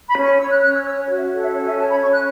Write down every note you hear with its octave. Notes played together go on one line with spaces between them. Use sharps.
B5
C#4
C#6
C#5 E6
F#6
C#4 F#6
E6
C#5 E6
C#5
F#4
E5
A4 C#5
E5
C#4 C#5
E5
C#5 A5
B5
C#4 C#6
F#6